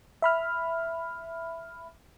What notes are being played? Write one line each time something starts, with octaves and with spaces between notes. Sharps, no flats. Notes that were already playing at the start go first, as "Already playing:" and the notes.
E5 B5 F6